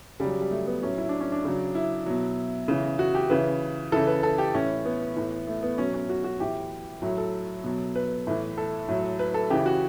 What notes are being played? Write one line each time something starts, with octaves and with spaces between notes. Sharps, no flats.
C#3 F#3 G3
G3
G3
A3
B3
A2 F#3 C#4
E4
D4
C#4
D4
C#3 F#3
E4
B2 F#3
C#3 E3
F#4
G4
C#3 E3 B4
C#3 E3 A4
B4
A4
G4
A2 E3 C#4
B3
A2 E3
A3
B3
B2 F#3 C#4
C#4
F#4
F#4
A2 E3 G4
A2 F#3
A4
B2 F#3
B4
A2 E3
A4
A2 F#3
B4
A4
C#3 E3 G4
F#4